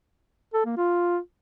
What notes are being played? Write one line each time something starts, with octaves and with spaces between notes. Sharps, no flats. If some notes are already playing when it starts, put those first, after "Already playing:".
A4
A#3
F4